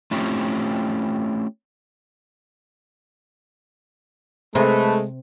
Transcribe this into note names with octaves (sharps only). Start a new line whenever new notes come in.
A3 C4 C#4 E4 F4 G4
C3 G#3 A3 B4